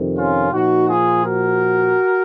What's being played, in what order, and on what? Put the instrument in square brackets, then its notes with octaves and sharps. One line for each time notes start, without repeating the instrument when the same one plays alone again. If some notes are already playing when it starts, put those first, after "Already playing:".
Already playing: [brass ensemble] F2 C3 D#3
C#4 F4
A#2 F3 D#4 F#4
F4 G#4
F#4 A#4